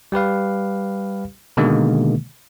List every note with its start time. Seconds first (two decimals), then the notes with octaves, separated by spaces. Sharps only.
0.12 G3 G4 B4 F5
1.57 B2 D3 D#3 G#3 A#3